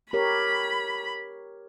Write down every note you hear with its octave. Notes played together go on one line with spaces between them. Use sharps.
G4 A#4 C#5 B5